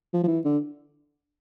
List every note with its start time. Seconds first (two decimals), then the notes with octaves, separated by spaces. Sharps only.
0.13 F3
0.24 F3
0.27 E3
0.45 D3